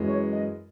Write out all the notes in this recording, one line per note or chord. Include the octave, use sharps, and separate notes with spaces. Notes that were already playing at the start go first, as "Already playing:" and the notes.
Already playing: F#2 E3 G#3
C#5
D#5